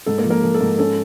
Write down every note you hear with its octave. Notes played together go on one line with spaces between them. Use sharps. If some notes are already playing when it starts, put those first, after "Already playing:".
G#2 A4
A#3 A#4
F3
A#3 A#4
F3 A4
A4
G#2
C#4 A4